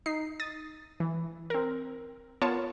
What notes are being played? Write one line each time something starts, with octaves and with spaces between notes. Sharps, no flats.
D#4 C7
D#6 A6
E3
C4 A#4
B3 F4 A#4 C#5 A5